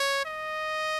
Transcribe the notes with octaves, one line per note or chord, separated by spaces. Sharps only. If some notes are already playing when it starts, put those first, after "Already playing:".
Already playing: C#5
D#5